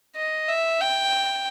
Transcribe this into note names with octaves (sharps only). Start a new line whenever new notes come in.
D#5
E5
G5